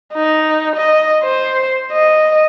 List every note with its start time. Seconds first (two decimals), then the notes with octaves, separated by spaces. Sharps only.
0.14 D#4
0.76 D#5
1.24 C5
1.92 D#5